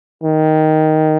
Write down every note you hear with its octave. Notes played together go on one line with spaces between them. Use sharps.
D#3